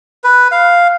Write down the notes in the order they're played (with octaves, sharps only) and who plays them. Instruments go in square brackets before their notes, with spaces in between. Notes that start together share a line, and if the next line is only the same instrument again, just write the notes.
[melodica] B4
F5